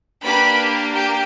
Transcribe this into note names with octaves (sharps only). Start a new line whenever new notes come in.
A#3 D4 G4 B4 B5
G4 G5